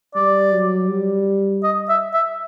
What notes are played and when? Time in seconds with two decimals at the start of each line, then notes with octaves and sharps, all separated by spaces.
0.15 G3 D5
0.52 F#3
0.89 G3
1.64 D#5
1.89 E5
2.13 E5